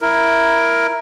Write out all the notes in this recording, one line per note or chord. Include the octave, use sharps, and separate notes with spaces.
E4 A#4